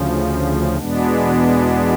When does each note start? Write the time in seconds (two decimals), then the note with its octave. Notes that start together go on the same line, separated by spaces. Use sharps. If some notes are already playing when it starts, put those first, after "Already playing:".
Already playing: D2 C#3 F3
0.77 E2 B2 G#3 B3 D4